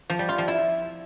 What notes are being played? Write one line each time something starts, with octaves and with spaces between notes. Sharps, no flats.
F3
G3
F4
F3
E4